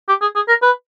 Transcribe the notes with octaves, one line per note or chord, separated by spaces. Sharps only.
G4
G#4
G#4
A#4
B4